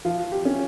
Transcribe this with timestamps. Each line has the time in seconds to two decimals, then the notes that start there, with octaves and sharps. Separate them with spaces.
0.05 F3 F4
0.32 G4
0.45 C#4